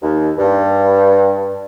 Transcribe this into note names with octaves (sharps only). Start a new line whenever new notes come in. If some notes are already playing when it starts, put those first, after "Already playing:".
D#2
G2